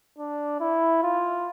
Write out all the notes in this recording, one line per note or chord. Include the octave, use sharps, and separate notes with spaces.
D4
E4
F4